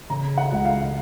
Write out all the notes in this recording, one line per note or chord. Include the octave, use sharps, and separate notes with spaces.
C#3 A#5
F#5
C#2
F5